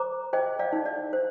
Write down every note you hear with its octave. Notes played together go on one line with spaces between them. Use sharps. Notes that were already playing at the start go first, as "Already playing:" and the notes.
Already playing: C5 A#5 D6
C5 D#5 G5
D5 F5
D#4
D5
C5